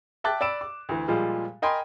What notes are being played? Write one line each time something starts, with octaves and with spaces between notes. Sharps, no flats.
E5 G5 A5 D6 F#6 A6
D5 B5 E6 D7 E7
D6
D2 E3
A#2 F3 G3 G#3
A#4 D#5 G5 G#5 B5 C6